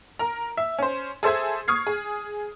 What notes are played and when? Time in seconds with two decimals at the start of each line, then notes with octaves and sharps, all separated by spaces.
0.19 A#4 A#5
0.57 E5
0.79 C#4 C5
1.23 G#4 A4 C5 E5 G#6
1.68 C#6 D#6 F6 G#6 C7
1.87 G#4